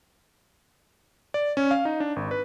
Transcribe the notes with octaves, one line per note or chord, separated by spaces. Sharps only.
D5
C#4
F5
D#4
D4
G#1
B4